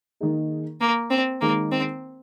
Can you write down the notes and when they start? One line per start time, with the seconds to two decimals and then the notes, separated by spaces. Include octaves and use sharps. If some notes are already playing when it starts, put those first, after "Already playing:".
0.20 D#3 A#3 D#4 G#4
0.81 A#3
1.11 C4
1.41 D#3 G#3 A#3 D#4
1.72 C4